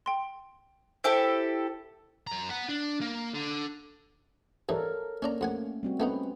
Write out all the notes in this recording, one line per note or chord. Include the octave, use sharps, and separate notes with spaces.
G5 C6
E4 G4 A4 C5
F#2 A#5
B3 F#5
D4
A#3
D3
G2 E3 A4 A#4 C#5
A#3 C#4 D4 A#5
F2 A3 C#4 F#5 G#5
G3 C4 F#4
A3 B3 C#4 D#4 B4 C5